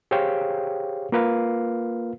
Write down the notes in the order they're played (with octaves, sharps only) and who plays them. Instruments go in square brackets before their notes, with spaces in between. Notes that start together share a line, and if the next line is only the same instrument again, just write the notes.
[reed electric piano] G4 G#4 C5 C#5 F5 G5
A#3 F4 A#4 B4 F5